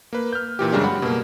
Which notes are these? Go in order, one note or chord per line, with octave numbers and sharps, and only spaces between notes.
A#3 B4
F6 G6
A#2 E3 G4
F#2 C#3 G3 G#3 D4
F#5 B5
B2 A#3